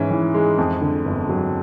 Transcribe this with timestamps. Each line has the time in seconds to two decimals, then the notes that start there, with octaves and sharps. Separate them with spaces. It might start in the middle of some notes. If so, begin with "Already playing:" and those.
Already playing: G#2 E3 C#4
0.10 E3
0.34 G#3
0.58 F2
0.81 D3
1.05 G1
1.29 F#3